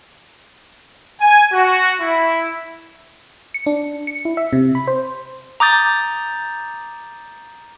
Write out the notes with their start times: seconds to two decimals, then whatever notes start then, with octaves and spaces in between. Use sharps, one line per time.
1.20 G#5
1.52 F#4
2.01 E4
3.54 C#7
3.66 D4
4.07 C#7
4.25 E4
4.37 E5
4.53 C3
4.75 B5
4.87 C5
5.60 A#5 D6 D#6 G6 A6